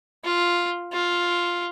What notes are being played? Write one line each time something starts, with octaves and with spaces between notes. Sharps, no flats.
F4
F4